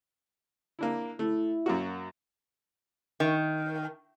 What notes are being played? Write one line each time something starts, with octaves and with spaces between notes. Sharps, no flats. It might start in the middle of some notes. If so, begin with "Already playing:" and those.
A#3 D4 E4
A3 E4
F#2 A#3 F#4
D#3